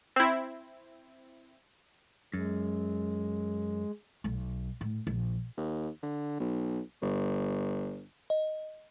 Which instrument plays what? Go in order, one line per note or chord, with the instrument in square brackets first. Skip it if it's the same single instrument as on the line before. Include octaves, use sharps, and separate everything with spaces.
[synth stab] C4 E4
[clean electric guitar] F#2 [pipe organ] G#3
[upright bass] B1
A2
A#1
[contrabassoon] D#2
D3
B1
G1
[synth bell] D#5